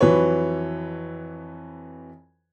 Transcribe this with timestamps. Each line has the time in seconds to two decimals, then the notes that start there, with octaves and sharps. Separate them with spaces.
0.01 F2 E3 F#3 B4 C#5